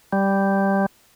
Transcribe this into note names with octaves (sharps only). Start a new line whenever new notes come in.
G3